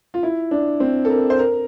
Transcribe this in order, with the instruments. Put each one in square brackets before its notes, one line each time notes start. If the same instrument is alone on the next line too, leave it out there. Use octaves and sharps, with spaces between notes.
[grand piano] F4
E4
D4
C4
A4
A#4
C5
A#4